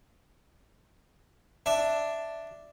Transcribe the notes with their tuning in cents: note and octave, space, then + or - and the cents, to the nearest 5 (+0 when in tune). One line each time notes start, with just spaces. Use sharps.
D4 +0 E5 +0